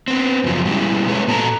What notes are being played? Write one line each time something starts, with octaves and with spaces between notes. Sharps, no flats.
B3 C4
F#2 C#3 F3 F#3
B2 G3 G#3 B3 C#4 E4
G#3 A3 B3 C#4 C#5
A#2 A4 A5 A#5